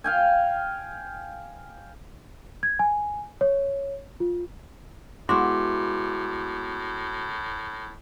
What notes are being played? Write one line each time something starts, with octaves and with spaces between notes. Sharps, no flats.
F5 G5 G#5
G#6
G#5
C#5
F4
A2 G#3 B3 E4 F#4 C6 D6